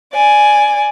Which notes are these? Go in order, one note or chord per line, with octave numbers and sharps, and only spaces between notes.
D5 G#5